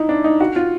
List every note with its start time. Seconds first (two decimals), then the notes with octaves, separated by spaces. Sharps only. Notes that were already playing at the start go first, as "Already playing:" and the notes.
Already playing: D#4 E4
0.09 D4
0.24 D#4
0.40 F#4
0.56 F4